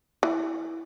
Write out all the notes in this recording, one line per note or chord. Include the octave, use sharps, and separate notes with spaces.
E3